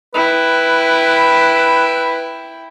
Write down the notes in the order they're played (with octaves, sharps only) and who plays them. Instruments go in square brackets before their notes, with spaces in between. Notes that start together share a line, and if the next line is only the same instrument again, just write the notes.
[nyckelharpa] E4 G5 [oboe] B4